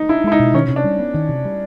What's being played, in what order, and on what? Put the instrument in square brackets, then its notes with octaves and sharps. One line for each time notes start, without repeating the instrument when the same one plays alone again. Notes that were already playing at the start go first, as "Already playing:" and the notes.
Already playing: [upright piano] D#4
[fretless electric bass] D4 [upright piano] E4
[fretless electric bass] G#3 [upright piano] E4
[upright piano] D#4
[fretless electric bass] B2
[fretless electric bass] D#3 [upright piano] C#4
[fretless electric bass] C3
[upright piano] D4
[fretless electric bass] G3
B3
D#3
C3
G3